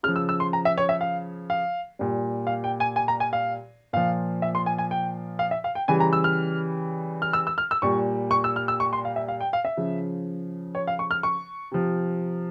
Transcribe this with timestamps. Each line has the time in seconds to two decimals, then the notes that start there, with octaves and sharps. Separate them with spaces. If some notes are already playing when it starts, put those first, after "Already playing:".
0.03 C#3 F6
0.08 F3
0.16 E6
0.29 E6
0.40 C6
0.53 A#5
0.65 E5
0.78 C#5
0.89 E5
1.01 F5
1.50 F5
1.99 A#2 G3
2.47 F5
2.64 G5
2.80 G#5
2.96 G#5
3.08 A#5
3.20 G#5
3.33 F5
3.93 A#2 F3 F5
4.42 E5
4.55 C6
4.66 G#5
4.78 G#5
4.91 G5
5.39 F5
5.51 E5
5.64 F5
5.75 G5
5.88 C#3 E3 G3 G#5
6.00 A#5
6.13 E6
6.24 F6
7.22 F6
7.33 E6
7.47 E6
7.58 F6
7.71 E6
7.82 A#2 G3 C#6
8.31 C#6
8.44 E6
8.56 F6
8.68 E6
8.80 C#6
8.93 C6
9.05 F5
9.16 E5
9.28 F5
9.41 G5
9.53 F5
9.65 E5
9.77 C#3 F3
10.75 C#5
10.87 F5
10.99 C#6
11.11 F6
11.23 C#6
11.71 C3 F3